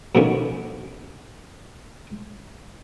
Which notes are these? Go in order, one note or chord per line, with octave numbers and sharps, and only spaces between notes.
B2 D3 D#3 F3 B3 C#4